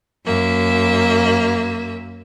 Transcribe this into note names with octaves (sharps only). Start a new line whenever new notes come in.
F#2 A#3 E5